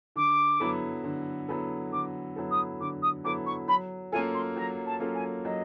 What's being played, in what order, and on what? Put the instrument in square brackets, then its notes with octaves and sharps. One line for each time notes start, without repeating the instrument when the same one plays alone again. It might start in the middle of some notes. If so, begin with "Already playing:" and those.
[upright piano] D3 [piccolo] D6
[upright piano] F#3 B3 E4 A4
D3
F#3 B3 E4 A4
[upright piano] D3 [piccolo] D6
[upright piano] F#3 B3 E4 A4
[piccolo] D#6
[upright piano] D3 [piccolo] D6
[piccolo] D#6
[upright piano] F#3 B3 E4 A4 [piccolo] D6
[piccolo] C#6
[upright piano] F#3 [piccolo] B5
[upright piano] A#3 C#4 F4 A4 [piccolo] G#5
[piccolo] C6
[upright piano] F#3 [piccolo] A#5
[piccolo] A5
[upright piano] A#3 C#4 F4 A4
[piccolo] G#5
[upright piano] F#3 [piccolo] D#5